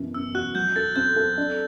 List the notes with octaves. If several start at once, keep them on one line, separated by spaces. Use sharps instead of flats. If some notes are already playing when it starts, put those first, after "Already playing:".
Already playing: F#2 B2 E3
F#2 E6
F#4 F#6
F#3 G6
A4 A6
C4 G6
A4
D4